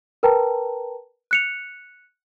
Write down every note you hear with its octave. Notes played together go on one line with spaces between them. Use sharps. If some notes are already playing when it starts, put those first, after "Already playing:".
A#4 B4 G5 A5 A#5
F#6 C#7 F7